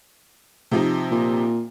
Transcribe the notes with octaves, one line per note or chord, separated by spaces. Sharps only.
C3 F3 D#4
A#2